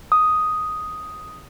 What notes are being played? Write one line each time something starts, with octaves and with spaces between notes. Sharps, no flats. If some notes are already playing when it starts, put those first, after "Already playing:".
D#6